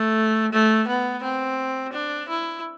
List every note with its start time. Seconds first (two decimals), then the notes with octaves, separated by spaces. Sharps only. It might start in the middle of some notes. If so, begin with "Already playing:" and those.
Already playing: A3
0.52 A3
0.88 B3
1.23 C4
1.93 D4
2.29 E4